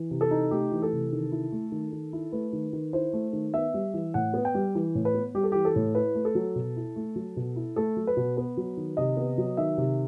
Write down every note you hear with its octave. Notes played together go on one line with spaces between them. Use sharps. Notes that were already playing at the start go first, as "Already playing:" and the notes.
Already playing: E3
C3
A4
D#4
A3 G4
E3
A4
C3
D#3
E4
A3
D#3
D#3
E4
A3 B4
D#3
D#3
E4 C5
A3
D#3
B3 E5
G3
E3
A2 F#5
B3
G5
G3
E3
A2
B4
B3
G3 G4
A4
E3 G4
A4
A2
E4 B4
A3
A4
F#3
B2
E4
A3
F#3
B2
E4
A3 A4
F#3
B4
B2
B3 B4
F#3
D#3
C3 D#5
B3
F#3
D#3 E5
C3